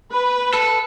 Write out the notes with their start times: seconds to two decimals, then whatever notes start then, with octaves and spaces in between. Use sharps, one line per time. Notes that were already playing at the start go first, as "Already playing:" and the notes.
0.12 B4
0.53 A4